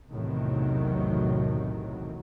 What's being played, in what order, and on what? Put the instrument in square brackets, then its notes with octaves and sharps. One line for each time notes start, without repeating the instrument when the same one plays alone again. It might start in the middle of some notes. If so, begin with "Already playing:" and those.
[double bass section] B1 E2 A2 C3 D#3 F#3